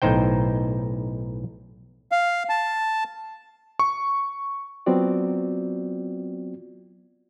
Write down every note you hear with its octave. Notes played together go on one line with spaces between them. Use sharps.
B1 A2 D#4 C5 G5
F5
A5
C#6
F#3 B3 C4 F4 F#4 D5